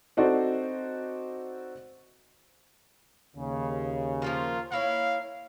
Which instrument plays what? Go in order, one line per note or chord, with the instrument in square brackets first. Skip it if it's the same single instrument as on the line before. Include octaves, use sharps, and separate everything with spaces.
[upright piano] C4 D#4 F#4 A4 C5 D5
[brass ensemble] D#2 C#3
[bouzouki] F3 A#3 A#4 [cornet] F4
[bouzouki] A#3 E4 C#5 [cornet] F5